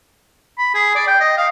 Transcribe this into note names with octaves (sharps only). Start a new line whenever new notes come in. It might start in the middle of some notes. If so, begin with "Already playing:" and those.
B5
G#4
D5
G5
D#5
F5